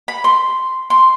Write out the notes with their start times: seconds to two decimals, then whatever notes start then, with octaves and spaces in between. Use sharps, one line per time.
0.08 B5
0.24 C6
0.90 C6